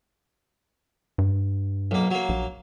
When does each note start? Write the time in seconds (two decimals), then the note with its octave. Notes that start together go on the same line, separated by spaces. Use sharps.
1.18 G2
1.91 B1 A#3
2.11 F#3 A#3
2.29 A#1